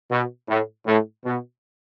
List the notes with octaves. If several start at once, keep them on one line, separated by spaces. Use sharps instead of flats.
B2
A2
A2
B2